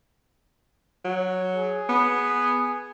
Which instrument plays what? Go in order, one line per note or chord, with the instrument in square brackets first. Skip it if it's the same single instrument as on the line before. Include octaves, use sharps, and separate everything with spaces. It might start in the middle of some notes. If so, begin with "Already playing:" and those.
[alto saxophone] F#3
[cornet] G#4
[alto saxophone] B3